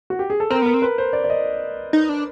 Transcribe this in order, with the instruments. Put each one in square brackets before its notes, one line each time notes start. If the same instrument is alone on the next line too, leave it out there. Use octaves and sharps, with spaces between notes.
[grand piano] F#4
G4
G#4
A4
[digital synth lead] C4 [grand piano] A#4
[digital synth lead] B3 [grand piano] A#4
[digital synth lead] C4
[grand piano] B4
C5
D5
D5
D#5
[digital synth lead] D#4
D4